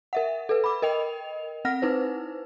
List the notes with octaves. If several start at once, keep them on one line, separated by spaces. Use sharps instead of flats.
A#4 E5 F#5
A4 B4
B5 D6
A#4 D#5 G5 F7
C4 F#5 F6 A#6
D#4 E4 B4 C5